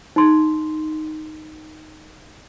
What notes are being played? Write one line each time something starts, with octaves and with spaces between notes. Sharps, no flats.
D#4 C6